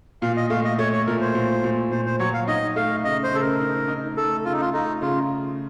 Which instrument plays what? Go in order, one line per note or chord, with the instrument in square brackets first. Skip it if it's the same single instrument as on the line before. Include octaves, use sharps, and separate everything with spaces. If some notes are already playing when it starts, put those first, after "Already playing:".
[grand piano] A#2 [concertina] F5
[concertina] D#5
[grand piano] A3 [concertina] F5
[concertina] D#5
[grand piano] A3 [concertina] C#5
[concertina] C#5
[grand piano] A#2 [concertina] A#4
[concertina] C5
[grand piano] A#2
A#2
[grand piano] A#2 [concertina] C5
[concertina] C5
[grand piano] F#3 [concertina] C#5
[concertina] F5
[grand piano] D#4 [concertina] D#5
[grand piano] A3 [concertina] F5
[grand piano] C#3 [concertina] D#5
[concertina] C5
[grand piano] C#3 [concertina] A4
[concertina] A#4
[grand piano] D#4
D#4
[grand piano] A3 [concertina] A4
[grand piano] C#3 [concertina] F4
[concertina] D#4
F4
[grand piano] A3 [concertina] D#4
[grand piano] C#3 [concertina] F4